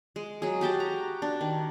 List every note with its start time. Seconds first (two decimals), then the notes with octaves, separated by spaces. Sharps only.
0.16 G#3
0.42 F#3 G#4
0.61 F#4 G4 G5 A5
0.80 A#5
1.22 D4
1.41 D#3